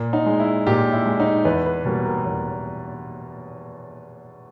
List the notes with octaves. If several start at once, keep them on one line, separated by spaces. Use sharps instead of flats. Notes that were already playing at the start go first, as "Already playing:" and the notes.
Already playing: A#2
D#4
G#3
E4
A#2 G4
E4
G#3
D#4
E2 B4
B4
B2 G3 A#3
A#4
E2